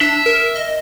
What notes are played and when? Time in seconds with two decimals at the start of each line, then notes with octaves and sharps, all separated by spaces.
0.01 D4 E5
0.26 A#4
0.55 D#5